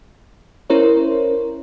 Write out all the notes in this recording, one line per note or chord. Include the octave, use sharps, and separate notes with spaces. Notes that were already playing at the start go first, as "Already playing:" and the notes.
C#4 E4 A#4 C5 C#5